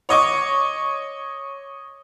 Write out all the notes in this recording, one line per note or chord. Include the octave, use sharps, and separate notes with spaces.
C#5 D#5 C#6 D6